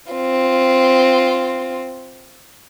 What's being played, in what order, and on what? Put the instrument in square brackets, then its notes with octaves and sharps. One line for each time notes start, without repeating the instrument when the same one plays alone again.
[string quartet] C4 F4